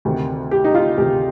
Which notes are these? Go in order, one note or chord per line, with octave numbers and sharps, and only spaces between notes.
D2 C3 D#3
G4
D#4
F4
D2 C3 D#3 G4